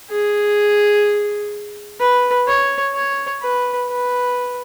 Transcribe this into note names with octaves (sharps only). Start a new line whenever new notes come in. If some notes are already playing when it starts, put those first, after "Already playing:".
G#4
B4
C#5
C#5
B4
B4